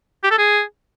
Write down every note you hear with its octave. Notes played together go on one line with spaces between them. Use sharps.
G4
A4
G#4